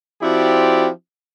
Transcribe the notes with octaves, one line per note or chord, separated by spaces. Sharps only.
F3 C4 E4 F#4 G4 D5